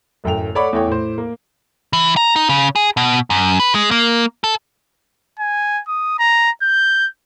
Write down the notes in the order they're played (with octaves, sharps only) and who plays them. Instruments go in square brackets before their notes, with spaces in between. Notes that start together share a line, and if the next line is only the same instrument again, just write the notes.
[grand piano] D1 F#2 A3 G5 F7
A4 C#5 D5 F#5 B5 D6
E2 A3 C#5 G5
A2 C5
A#3
[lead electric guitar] E3
A#5
D#4
C#3
G#4
B2
F#2
B4
G#3
A#3
A4
[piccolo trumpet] G#5
D#6
A#5
G6